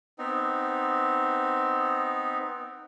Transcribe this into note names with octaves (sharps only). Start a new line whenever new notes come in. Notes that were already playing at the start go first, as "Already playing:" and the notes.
B3 C4 D#4